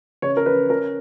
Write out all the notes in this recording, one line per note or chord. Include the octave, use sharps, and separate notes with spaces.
C#3 C#5
A#4
C#4 B4
C#4 A#4